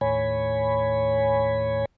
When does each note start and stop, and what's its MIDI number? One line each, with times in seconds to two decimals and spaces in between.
0.01 1.85 39
0.01 1.85 45
0.01 1.85 73
0.01 1.85 80
0.01 1.85 83